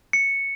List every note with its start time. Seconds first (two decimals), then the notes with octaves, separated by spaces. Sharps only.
0.13 C#7